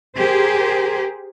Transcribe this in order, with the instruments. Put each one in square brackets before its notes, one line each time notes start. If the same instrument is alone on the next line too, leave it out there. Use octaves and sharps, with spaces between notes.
[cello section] G4 G#4 A#4 C5